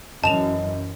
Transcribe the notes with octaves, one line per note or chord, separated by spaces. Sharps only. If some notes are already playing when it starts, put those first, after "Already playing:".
F#2 E3 D#5 A5 E7 F7